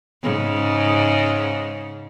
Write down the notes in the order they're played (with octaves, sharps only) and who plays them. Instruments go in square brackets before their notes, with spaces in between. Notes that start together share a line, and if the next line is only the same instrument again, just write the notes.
[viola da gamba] G#2 C#3